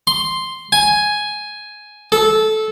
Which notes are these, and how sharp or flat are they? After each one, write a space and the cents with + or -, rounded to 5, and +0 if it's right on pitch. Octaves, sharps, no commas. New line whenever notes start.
C6 +0
G#5 +5
A4 -15